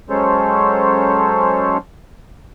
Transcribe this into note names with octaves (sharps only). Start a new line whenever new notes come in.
F#3 G#3 C#4 A4 C5 C#5